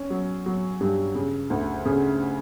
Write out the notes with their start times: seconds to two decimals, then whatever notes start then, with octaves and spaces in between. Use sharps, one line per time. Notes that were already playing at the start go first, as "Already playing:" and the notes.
Already playing: C#4
0.10 F#3
0.46 F#3
0.81 G2
1.15 C#3
1.50 D2
1.85 C#3